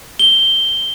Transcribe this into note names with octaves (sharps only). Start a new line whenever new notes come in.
G7